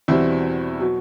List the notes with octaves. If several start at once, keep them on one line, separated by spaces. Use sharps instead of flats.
E2 B2 G3 C4 E4
B2 F#3